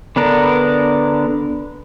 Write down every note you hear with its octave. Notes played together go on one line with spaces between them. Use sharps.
D3 B3 D4 A#4